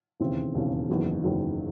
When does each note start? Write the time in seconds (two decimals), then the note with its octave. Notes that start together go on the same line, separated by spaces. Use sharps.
0.20 E1 D#2 C#3 E3 C4
0.54 E1 D#2 C#3 E3 C4
0.89 F#1 E2 D#3 F#3
1.24 F#1 E2 D#3 F#3